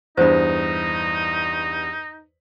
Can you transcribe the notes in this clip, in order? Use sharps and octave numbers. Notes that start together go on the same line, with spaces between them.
E2 G2 D#4 C5 B5